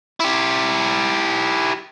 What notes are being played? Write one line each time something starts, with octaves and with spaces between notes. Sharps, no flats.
E4 G4